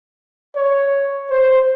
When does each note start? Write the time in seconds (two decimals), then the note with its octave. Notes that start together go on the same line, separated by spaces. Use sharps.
0.56 C#5
1.31 C5